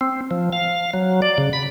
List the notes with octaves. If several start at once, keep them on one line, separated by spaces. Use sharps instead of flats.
C4
F3
F5
F#3
D5
C#3
B5